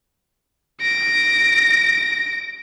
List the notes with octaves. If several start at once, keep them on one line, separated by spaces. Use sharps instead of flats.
A#6 D7